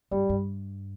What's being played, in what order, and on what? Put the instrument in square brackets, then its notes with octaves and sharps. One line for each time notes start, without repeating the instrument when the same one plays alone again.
[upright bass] G2 [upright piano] G3
[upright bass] G2